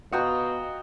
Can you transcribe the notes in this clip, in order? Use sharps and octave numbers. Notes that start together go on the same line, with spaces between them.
B2 F4 F#4 D#5 F#5 G5 A#5